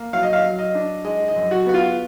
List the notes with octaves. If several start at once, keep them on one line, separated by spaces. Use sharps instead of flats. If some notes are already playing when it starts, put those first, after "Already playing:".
Already playing: A#3
F#3 F5
D#5
F5
F#3
D#5
D4
G#3 D#5
D#5
F#2
F#4
B3 F#4
F4